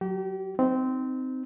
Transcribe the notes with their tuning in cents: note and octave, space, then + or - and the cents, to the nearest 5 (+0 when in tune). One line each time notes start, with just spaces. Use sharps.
F#3 +0 G4 -35
C4 -15 D#4 +0